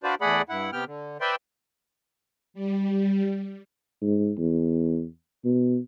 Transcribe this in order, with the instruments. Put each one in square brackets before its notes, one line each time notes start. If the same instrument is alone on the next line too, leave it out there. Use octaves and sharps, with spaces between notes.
[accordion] D4 F4 F#4 B4 C5 D5
E2 A3 G#4 D5 F#5 B5
G2 E4 F#5
C3 B3 G4 G5 F6
D3
B4 C5 D5 E5 G5 C6
[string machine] G3
[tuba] G#2
E2
B2